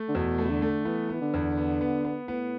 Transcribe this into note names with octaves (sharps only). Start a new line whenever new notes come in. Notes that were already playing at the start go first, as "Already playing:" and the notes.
Already playing: A3
D3
E2 B2
A3
B2
D3
A3
E3 B3
E3 B3
D3
E2
B3
B3
B3
A2 B3